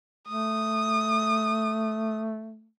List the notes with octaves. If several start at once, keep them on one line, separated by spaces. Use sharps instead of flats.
A3 D#6